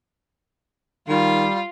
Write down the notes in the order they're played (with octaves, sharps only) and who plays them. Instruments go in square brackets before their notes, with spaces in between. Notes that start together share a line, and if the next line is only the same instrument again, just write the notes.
[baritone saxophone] D#3 [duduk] G3 [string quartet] F4